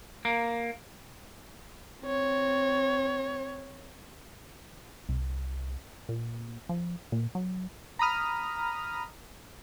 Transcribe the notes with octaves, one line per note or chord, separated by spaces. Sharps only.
A#3
C4 C#5
C2
A#2
F3
A#2
F#3
A#5 B5 D#6 F6